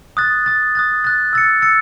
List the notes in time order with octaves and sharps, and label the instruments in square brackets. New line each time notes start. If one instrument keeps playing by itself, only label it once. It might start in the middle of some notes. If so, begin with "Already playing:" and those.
[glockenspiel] D#6 F#6 A6
D#6 F#6 A6
D#6 F#6 A6
D#6 F#6 A6
E6 A6 C#7
E6 A6 C#7